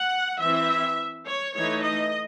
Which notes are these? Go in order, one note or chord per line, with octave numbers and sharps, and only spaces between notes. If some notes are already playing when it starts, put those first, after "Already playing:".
Already playing: F#5
E3 C4 E4 E5
C#5
E3 A3 D#4 C#5
D#5